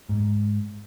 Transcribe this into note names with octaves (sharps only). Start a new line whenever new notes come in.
G#2